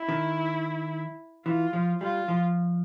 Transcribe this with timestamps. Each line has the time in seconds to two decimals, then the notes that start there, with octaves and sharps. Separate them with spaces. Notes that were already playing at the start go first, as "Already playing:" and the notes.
Already playing: E4
0.09 D#3
1.46 E3 F4
1.73 F3
2.01 G3 F4
2.28 F3